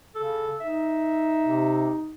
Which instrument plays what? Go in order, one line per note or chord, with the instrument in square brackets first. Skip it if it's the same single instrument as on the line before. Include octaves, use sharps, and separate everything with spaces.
[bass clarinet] C#3 [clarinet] A4
[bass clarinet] D#4 [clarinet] E5
[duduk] C3